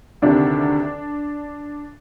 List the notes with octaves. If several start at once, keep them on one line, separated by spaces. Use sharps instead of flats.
D2 C3 D#3 D4